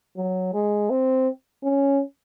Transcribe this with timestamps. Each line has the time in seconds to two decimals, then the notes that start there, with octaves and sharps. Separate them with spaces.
0.17 F#3
0.54 G#3
0.90 C4
1.63 C#4